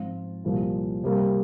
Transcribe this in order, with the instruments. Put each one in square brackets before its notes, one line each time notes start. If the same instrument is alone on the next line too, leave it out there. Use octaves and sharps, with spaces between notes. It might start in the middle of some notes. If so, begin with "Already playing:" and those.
Already playing: [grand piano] G#2 F3 C4 F4
C2 A#2 F3 A#3 F4
C3 G3 A#3